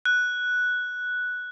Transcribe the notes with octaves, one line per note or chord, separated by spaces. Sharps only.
F#6